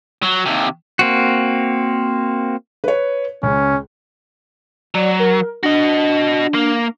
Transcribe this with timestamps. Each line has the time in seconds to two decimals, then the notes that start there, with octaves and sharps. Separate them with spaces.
0.23 F#3
0.46 D#2 C3
0.99 A#3 C4 F#4
2.84 B4 C#5
3.43 C#2 C#4
4.95 F#3 D5
5.19 A#4
5.63 D4 F#4 D#5
6.54 A#3